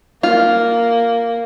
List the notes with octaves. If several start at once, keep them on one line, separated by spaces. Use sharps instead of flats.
A#3 F4